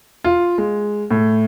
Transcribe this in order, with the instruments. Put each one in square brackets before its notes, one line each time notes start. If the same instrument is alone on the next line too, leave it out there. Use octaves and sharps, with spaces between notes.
[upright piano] F4
G#3
A2